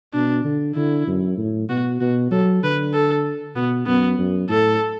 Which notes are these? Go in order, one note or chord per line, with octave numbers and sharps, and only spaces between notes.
B2 D4
D3
D3 E4
F#2
A2
B2 F#4
B2 F#4
F#3 A4
D3 B4
A4
B2 B3
F#2 B3
F#2
A2 A4